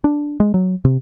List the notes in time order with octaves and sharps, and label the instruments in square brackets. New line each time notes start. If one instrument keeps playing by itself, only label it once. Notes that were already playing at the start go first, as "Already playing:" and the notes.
[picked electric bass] D4
G#3
F#3
C3